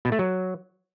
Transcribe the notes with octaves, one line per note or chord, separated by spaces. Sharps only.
B2
A3
F#3